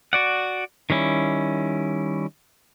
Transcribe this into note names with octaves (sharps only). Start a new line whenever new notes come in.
F#4 D5 F#5
D#3 G3 C#4 E4